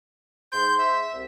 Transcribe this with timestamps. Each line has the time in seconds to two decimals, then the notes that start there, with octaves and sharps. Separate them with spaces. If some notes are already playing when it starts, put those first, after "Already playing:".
0.52 G#2 C6 G6
0.78 E5
1.13 C2